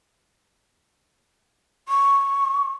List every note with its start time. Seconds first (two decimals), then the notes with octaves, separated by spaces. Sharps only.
1.88 C#6